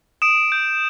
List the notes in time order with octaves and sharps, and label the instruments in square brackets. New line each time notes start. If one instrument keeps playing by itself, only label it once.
[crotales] D#6 D7 E7
G6